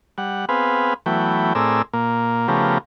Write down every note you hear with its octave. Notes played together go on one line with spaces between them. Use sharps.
G3 F#5
B3 C4 G#4 B4 F5
E3 F#3 A3 B3 G5
A2 C4 G#4 A#4 D5 E6
A#2 A#3
C#3 F3 A3 B3 G4 A#4